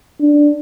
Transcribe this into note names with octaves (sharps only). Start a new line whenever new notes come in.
D4